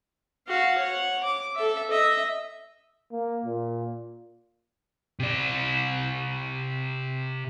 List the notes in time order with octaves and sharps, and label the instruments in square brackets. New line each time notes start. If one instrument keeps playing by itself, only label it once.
[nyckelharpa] F#4 F5
C#5 F#5
D6
A4 E5
D#5 E5
[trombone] A#3
A#2
[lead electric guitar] C3 D5